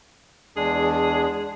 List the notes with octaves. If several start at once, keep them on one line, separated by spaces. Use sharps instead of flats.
E2 G#3 D4 G#4